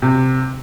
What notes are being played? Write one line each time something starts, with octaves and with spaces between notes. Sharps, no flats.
C3